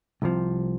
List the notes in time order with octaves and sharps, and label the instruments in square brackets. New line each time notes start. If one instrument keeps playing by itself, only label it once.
[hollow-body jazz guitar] C2 C3 F3